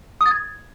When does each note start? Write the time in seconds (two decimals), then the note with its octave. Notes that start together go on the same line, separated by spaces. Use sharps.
0.21 D#6
0.26 A6
0.31 G#6